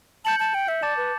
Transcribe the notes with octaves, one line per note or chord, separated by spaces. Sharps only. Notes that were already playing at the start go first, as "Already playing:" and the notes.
A5 G6 C#7 F#7
A5
G5
E5
D5 A5 D6 A6 E7
B4